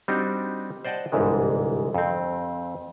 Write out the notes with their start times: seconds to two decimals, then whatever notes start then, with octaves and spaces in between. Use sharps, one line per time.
0.08 G3 C4 D4 D#4 F#4 G4
0.85 C5 D5 D#5 F#5 G5 A5
1.12 G1 C2 G#2 E3 G#3
1.94 F2 C4